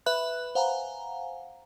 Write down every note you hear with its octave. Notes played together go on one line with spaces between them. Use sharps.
B4 E5 B5 F#6
C5 F5 F#5 G#5 A#5